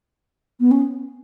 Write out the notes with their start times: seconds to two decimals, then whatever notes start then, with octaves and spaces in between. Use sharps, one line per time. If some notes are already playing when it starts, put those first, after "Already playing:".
0.60 B3
0.71 C#4